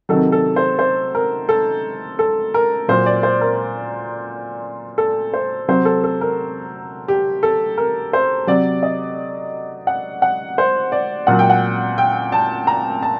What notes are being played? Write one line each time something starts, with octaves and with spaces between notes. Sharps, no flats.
C3 D#3 F#3 A4
A4
C5
C5
A#4
A4
A4
A#4
A#2 F#3 C5
D5
C5
A#4
A4
C5
C3 F#3 C5
A4
A4
A#4
G4
A4
A#4
C5
C3 F#3 D5
D#5
F#5
F#5
C5
D5
A#2 F#3 F#5
G5
F#5
G5
A5
A#5
A5